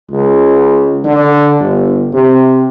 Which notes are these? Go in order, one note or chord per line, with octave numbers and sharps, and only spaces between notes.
C#2
D3
G1
C3